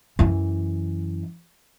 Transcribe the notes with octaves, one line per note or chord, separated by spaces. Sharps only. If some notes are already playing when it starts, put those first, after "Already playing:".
F#2 E3